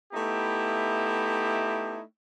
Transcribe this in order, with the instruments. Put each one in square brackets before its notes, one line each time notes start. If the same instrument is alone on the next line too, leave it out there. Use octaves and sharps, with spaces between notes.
[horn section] A3 B3 D#4 E4 G4